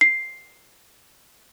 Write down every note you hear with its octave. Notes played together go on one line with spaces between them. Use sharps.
C7